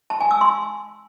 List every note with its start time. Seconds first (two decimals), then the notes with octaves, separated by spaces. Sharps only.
0.10 A5
0.20 G#5
0.31 E6
0.41 C6